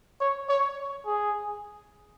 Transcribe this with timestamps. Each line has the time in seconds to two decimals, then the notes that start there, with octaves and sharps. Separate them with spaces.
0.20 C#5
0.49 C#5
1.06 G#4